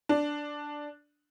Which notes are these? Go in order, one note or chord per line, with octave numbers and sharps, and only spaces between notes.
D4